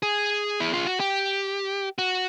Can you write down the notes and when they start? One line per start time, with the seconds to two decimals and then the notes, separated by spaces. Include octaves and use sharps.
0.03 G#4
0.60 E4
0.74 F4
0.87 F#4
1.00 G4
1.98 F#4